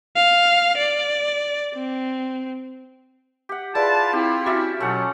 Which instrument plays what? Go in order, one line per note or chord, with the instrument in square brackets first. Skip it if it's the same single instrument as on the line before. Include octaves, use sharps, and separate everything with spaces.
[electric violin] F5
D5
C4
[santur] G4 F#5
[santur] E4 [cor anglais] F4 [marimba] G#4 D5 [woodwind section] B4 A5
[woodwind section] C4 E4 [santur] G4
[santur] C#4 D5 E5 [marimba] F#4
[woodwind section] B2 F#3 [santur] A3 F4 F#5 [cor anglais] C#4